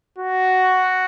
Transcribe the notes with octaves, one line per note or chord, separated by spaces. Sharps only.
F#4